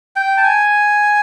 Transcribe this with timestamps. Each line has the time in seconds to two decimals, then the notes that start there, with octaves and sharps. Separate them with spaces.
0.16 G5
0.37 A5
0.44 G#5